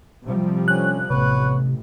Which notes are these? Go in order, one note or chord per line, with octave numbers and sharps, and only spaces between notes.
C3 F3 G3
D3 C#4 F#6
A1 C3 B3 B4 C#5